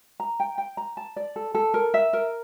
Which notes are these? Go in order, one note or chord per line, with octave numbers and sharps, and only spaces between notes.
A#5
G5
G5
A#5
A5
D5
A4
A4
A#4
E5
A#4